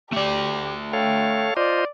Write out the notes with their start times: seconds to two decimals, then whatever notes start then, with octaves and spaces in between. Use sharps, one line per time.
0.13 A3 G4 D5
0.93 A4 C#5 F5 G5
1.57 F4 C5 D5 D#5